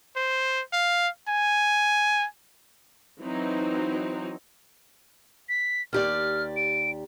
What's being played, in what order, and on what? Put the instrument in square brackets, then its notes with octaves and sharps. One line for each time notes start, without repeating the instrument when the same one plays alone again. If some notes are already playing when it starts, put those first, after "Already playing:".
[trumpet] C5
F5
G#5
[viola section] E3 F#3 C4 D#4
[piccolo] B6
[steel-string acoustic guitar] D#2 G4 D5 [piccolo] F6
[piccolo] D7